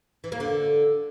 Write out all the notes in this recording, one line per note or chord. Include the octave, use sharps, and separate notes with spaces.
E3
A#3
D3